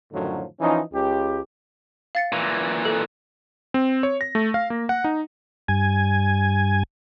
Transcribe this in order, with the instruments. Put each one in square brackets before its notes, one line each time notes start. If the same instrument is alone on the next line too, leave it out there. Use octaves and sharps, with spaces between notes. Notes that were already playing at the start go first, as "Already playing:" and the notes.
[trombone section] F#2 A2 D3 D#3 F3 F#3
E3 F3 C#4 D#4
C#2 G4
[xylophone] F5 A6 C#7
[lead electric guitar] A#2 E3
[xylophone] A4
[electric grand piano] C4
C#5
A#6
A3
F5
A#3
F#5
D#4
[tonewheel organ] G2 G#5